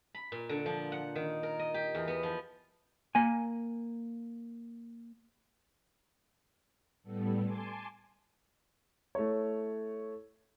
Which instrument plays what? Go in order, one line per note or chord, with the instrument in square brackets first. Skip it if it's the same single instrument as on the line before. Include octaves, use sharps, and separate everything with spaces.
[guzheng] B5
A#2
D3
F3
F#5
D#3
A#4
D#5
G4
E2
B3
F3
[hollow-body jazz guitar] A#3 G#5
[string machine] A2 G3 B3 A4
G#5 A5 C6 D6
[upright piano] A3 E4 C#5